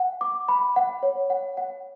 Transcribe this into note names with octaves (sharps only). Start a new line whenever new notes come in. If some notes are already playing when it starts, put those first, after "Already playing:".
Already playing: F#5
D6
B5
F#5
C#5
F#5
F#5